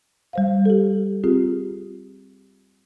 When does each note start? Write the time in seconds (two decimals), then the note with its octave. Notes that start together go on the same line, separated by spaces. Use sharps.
0.33 G3 C5 F5
0.66 G4 A4
1.24 C4 F4 G4 G#4